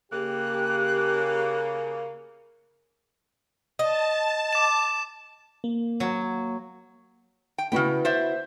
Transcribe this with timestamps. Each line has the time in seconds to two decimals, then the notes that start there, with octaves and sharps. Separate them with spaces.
0.12 C#3 A#3 G4 F#6
3.79 D#5 A5
4.53 D6 E7
5.64 A#3
6.00 F#3
7.58 G5
7.72 C#3 B3 E4 F#4 G5
8.05 C5 D5 E5